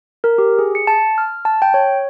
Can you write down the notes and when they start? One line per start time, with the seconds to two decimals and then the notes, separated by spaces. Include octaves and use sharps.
0.24 A#4
0.38 G4
0.59 G#4
0.75 C#7
0.87 A5
1.18 F6
1.45 A5
1.62 G5
1.74 C#5